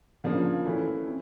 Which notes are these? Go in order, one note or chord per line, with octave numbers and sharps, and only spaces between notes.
C#3 F3 A#3 D4
E3 A3 C#4 E4
C4